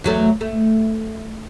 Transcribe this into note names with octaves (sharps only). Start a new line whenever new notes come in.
E2 F#3 A3
A3